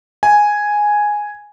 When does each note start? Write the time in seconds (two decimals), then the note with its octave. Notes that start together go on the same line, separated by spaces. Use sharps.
0.23 G#5